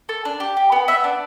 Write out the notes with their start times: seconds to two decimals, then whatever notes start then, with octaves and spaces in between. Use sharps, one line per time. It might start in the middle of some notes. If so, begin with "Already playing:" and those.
0.09 A4
0.25 D4
0.40 G4
0.57 G4
0.72 B3
0.88 B3 E5
1.04 D4